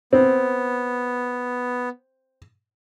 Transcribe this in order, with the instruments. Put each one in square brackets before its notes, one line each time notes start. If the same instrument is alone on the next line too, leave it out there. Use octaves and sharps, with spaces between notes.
[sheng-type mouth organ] B3 [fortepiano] C4